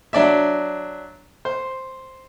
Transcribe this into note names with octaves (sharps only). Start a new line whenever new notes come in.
F#3 D4 D5 E5
C5